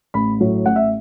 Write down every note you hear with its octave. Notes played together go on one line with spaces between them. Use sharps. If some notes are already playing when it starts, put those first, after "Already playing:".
A1 B5
A2 F#3
A1 F#5
E5